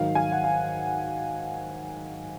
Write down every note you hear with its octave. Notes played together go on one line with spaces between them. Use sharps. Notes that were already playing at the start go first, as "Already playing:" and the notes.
Already playing: G#2 D#3 F#3 F5
F5 G#5
F#5
F5